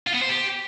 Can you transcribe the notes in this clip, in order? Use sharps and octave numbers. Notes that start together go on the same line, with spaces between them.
F4
B3
C5
G4